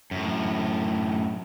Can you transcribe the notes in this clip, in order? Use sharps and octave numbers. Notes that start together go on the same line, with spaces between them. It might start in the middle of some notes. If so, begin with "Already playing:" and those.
F#2 A2